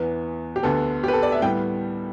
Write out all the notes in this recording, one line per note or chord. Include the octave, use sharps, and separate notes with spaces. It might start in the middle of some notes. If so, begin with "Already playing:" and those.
Already playing: E2 E3 B3
G4
D2 D3 B3 A4
G4
B4
A4
D5
E5
A2 G3 B3 G5